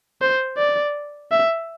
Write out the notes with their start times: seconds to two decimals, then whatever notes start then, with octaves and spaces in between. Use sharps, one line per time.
0.21 C5
0.57 D5
1.32 E5